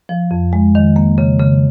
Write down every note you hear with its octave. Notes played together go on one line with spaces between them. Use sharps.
F3
F2
G#3
D#3
A#3
C#3
C#3